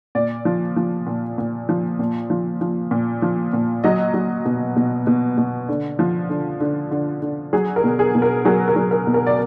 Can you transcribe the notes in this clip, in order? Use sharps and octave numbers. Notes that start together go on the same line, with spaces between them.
A#2 D5
F3
F3
A#2
A#2
F3
A#2
F3
F3
A#2
F3
A#2
F#3 D#5
F#3
B2
B2
B2
B2
D3
F3
D3
D3
D3
D3
F#3 G#4
A#4
B2
G#4
B2
A#4
F#3 G#4
A#4
F#3
A#4
B2
A#4
D5